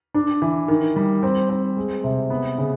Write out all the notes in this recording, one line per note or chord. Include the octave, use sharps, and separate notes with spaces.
D4
E3
D#3
G3
C4
C4
G#3
C3
B3
C#3